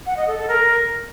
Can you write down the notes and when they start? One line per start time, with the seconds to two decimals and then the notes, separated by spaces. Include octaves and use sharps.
0.06 F#5
0.17 D#5
0.27 A4
0.38 A4
0.48 A#4